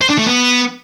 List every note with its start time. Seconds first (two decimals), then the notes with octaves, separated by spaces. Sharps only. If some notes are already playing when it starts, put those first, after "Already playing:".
0.01 C5
0.10 D4
0.18 A3
0.27 B3